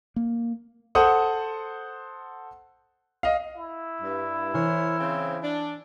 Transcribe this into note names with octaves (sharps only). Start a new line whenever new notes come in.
A#3
A4 C5 F#5 D#6
D#5 F5
E4
G2
E3 A#4 C5 C#5
C#3 C4
D4